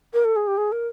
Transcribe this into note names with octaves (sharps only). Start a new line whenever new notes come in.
A#4
A4
G#4
G4
G#4
A#4